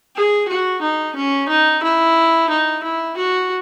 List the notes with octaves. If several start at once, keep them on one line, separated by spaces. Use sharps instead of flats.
G#4
F#4
D#4
C#4
D#4
E4
D#4
E4
F#4